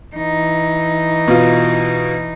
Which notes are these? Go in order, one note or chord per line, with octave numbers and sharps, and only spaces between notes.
E3 D#4
B2 F4